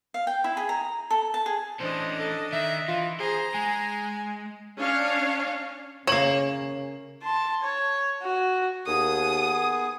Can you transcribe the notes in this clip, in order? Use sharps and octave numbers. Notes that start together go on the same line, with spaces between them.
F5
G5
E4
G#4
A#5
A4
A5
G#4
E3 C#4 D4 C5 D#5
A4
D#3 E5
E3 F4
G#4 C5 A#5
G#3 G#5
C#4 D4 C#5 F5
C#3 A#3 C#5 E7 F#7
A5 C6
C#5
F#4
D#2 B3 G#4 D#6